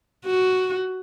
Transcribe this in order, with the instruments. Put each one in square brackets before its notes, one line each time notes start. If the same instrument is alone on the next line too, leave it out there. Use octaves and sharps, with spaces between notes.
[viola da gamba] F#4